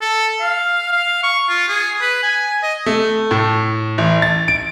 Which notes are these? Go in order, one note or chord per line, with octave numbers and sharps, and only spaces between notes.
A4
F5
F5
C#6
F4
G#4
B4
G#5
D#5
A3
A2
A1
A6
D7